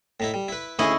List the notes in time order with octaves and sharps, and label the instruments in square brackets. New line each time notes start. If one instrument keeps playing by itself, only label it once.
[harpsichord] A2 D#4 E4
G3
E4 B4
[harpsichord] D2 G#4 [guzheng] C#4 E4 D#5